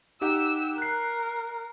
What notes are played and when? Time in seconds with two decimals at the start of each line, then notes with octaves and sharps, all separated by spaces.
0.21 D#4 G4 F#5 E6
0.78 A#4 F#6 C7